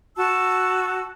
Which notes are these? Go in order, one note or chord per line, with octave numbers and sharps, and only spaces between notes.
F#4 A5 E6